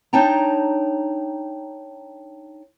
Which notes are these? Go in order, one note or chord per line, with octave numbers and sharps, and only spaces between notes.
D4 D#4 C#5 G5 A5 A#5